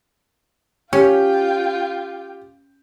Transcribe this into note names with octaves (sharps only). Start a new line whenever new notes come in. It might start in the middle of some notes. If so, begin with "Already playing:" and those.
C#4 F4 G4 G5